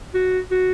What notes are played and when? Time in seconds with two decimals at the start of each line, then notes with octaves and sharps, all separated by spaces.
0.14 F#4
0.51 F#4